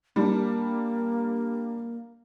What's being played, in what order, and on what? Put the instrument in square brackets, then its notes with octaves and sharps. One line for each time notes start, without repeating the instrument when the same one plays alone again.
[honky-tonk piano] G3 D4 [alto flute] A#3